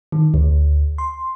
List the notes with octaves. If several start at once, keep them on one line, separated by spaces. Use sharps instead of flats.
D#3
D2
C6